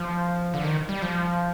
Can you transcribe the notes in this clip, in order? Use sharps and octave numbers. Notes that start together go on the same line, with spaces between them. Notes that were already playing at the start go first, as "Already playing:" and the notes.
Already playing: F3
D3
D#3
G3
F3